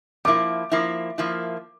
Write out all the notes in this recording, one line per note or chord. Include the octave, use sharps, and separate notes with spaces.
F3 A#3 E4 D6
F3 A#3 E4
F3 A#3 E4